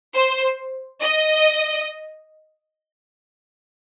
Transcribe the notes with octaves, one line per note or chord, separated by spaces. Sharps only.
C5
D#5